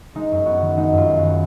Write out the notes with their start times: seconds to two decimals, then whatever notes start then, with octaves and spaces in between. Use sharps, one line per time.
0.15 G#3 D#4
0.32 F#2
0.46 B3 F#4
0.62 D#3
0.77 G#3 D#4
0.93 F#2 F4
1.08 B3
1.19 D#3 F#4